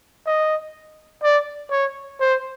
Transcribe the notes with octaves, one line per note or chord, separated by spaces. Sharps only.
D#5
D5
C#5
C5